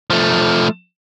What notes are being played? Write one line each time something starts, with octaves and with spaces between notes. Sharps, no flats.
F3 A3